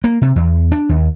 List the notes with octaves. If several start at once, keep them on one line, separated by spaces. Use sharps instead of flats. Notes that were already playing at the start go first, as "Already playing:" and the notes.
A#3
C3
E2
D4
D#2